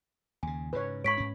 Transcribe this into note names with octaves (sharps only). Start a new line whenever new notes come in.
D#2 C#3 G#5
G#2 C#3 B4 C#5
G#2 C#5 B5 C#6 B6 D7
G#2 C#4